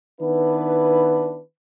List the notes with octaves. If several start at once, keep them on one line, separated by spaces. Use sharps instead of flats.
D#3 B3 D4 E4 B4